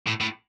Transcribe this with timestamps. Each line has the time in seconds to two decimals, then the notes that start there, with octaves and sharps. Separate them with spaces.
0.07 A2
0.21 A2